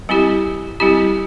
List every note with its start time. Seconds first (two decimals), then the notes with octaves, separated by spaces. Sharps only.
0.09 G3 C4 E4 G4
0.80 G3 C4 E4 G4